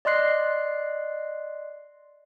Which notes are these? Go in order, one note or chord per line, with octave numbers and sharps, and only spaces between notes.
D5 D#5 C6 F#6 C7